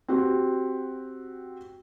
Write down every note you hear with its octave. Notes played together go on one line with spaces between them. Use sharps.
C4 F#4 G4